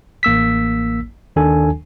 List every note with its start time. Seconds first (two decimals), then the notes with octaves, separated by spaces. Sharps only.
0.23 A1 A#3 E6 B6
1.36 D#2 D#3 D4 A4 G#5